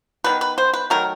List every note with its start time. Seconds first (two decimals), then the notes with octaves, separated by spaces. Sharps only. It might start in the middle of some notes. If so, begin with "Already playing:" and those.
0.24 D#3 G3 B3 B4
0.41 B4
0.58 C5
0.73 B4
0.90 D#3 F#3 A3 A#4